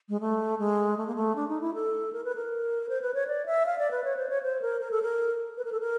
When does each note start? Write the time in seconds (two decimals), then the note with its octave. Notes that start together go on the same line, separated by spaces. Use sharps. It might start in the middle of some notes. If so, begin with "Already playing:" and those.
0.09 G#3
0.21 A3
0.59 G#3
0.97 A3
1.07 A#3
1.16 A3
1.36 D4
1.48 D#4
1.61 E4
1.74 A4
2.13 A#4
2.25 B4
2.36 A#4
2.89 C5
3.02 B4
3.14 C#5
3.27 D5
3.46 E5
3.66 F5
3.79 D5
3.91 B4
4.04 C#5
4.17 C5
4.29 C#5
4.43 C5
4.62 A#4
4.81 A#4
4.91 A4
5.02 A#4
5.57 B4
5.65 A#4
5.72 A4
5.80 A#4